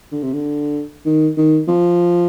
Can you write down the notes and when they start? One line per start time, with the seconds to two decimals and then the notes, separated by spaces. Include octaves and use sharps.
0.12 D3
0.23 C3
0.33 D3
1.06 D#3
1.37 D#3
1.68 F3